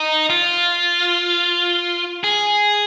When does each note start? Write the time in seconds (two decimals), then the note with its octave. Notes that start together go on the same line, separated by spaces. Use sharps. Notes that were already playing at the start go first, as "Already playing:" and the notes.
Already playing: D#4
0.30 F4
2.24 G#4